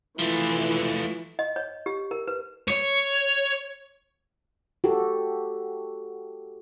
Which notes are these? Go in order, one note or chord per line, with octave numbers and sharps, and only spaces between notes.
E3 F3 A3
D#5
C#5
G4
A#4
B4
C#5
F#4 G4 A4